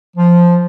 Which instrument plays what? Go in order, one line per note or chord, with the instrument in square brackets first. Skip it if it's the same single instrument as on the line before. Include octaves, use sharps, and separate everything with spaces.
[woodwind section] F3